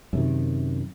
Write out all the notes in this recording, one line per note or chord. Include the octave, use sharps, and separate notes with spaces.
F#2 C3 D#3